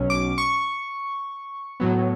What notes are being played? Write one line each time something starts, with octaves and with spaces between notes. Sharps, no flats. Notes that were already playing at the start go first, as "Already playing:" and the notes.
Already playing: B1 B2 F#3 C#4
D6
C#6
A2 F#3 B3